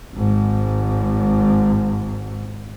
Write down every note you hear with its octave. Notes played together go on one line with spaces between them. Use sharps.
G#1 G#2